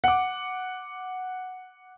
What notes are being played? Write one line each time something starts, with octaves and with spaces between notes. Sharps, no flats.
F#5 D6